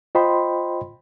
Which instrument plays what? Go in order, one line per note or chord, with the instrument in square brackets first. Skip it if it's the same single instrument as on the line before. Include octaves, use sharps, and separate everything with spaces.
[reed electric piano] F4 C5 D#5 G5 B5 C6